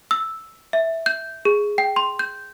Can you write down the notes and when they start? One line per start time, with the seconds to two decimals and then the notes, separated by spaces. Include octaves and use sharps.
0.11 E6
0.73 E5
1.06 G6
1.45 G#4
1.78 G5
1.96 C6
2.19 G6